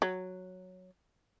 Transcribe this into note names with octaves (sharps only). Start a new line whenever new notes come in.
F#3